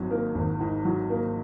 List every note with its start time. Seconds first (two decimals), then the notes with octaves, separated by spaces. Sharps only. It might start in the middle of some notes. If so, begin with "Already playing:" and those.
Already playing: G#1 G#2 F#3
0.10 A#3
0.35 G#1
0.60 G#2
0.85 F#3
1.10 A#3